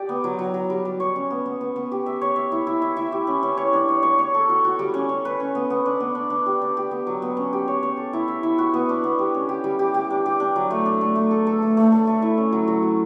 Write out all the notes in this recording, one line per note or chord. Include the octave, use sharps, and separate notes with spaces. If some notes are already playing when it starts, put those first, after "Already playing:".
Already playing: G4 D5
B3
F#3
F#3
F#3
G3
G3
C#5
C#4
B3
B3
B3
B3
G4
E5
C#5
E5
E4
E4
E5
E4
G4
C#4
C#4
C#5
D4
C#5
C#5
C#5
A4
F#4
F#4
G3
C#4
C#4
B4
C#4
B3
B3
D4
B3
D4
D4
G4
D4
G4
B3
F#3
B3
C#4
G4
C#5
C#5
A4
E4
E5
E4
F#4
B3
D4
B3
G4
C#4
G4
G3
G4
G4
D4
G4
D4
F#3
A3
D4
A3
A3
A4
A4
A3
A3
A3
A3
E4
C#4
F#3
F#3
F#4